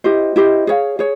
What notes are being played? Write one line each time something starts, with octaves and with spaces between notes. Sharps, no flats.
E4 G4 C5 D#5
E4 G4 C5 D#5
G#4 C#5 F5
G#4 C#5